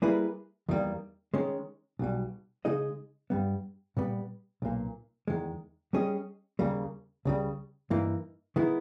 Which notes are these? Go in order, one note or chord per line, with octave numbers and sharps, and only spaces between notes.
G3 A#3 E4 G#4 B4
E2 D#3 G3 A#3
D#3 G#3 C#4
B1 B2 G3
C#3 G#3 D#4 G#4 D#5
G2 G3 B3
A#2 G3 B3
B1 A#2 A#3
E2 D#3 G#3
G3 C#4 G#4 D#5
D#2 C#3 G3 A#3
C#2 C#3 G3
G2 E3 A#3 D#4
D#3 G#3 B3 E4